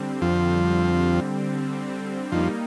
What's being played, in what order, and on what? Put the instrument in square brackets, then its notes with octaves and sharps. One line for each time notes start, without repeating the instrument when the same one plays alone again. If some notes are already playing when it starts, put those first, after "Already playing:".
Already playing: [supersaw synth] D3 G3 C4
[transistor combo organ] F2 F3
[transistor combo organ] F2 F3 [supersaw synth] G3 A#3 D#4